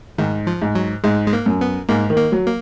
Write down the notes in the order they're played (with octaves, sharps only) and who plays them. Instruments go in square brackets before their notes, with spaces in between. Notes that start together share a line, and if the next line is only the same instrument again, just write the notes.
[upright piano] G#2 [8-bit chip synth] D#3
[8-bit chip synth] F3
[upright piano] G#2
[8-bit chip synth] F#3
[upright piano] G#2 [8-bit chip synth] G#3
[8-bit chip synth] G#3
A#3
[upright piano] F#2
[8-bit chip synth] B3
[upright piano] G#2 [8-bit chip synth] A#3
[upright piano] D#3
[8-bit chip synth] A#3
[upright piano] F#3
[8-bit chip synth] A#3